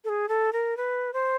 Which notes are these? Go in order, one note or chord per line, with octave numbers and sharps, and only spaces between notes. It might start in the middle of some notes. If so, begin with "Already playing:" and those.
A4
G#4
A4
A#4
B4
C5